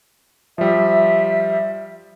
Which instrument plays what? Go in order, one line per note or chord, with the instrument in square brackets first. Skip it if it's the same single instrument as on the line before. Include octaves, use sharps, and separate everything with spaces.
[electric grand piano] F3 G3 [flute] E5